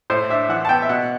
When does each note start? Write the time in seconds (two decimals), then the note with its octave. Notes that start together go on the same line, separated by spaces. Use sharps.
0.10 A2 C5
0.30 D4 E5
0.49 E3 F#5
0.65 A5
0.69 B3 G5
0.82 E5
0.89 B2 F#5